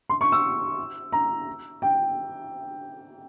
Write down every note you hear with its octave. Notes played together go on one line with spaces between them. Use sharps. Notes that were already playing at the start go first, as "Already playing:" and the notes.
C6
C#6
E6
A#5
G5